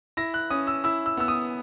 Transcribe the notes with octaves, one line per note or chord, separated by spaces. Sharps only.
E4 A#6
F#6
C#4 D#6
E6
E4 E6
E6
B3 E6
D#6